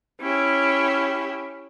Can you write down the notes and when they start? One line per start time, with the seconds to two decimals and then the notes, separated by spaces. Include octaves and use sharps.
0.20 C#4 E4 G4